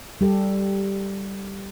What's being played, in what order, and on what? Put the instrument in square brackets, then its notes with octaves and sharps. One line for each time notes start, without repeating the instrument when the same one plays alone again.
[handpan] G3 G4 A4